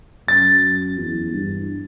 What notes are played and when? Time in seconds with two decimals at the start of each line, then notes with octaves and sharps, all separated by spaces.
0.28 F#2 A6
0.98 E2
1.32 G2